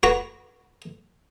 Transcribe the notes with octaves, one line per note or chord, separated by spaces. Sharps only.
F#4 B4 A#5 B5